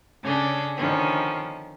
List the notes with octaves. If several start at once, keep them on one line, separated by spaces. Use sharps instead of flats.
C#3 C#4 D4 G#4 A4
D3 D#3 F3 B3 C#4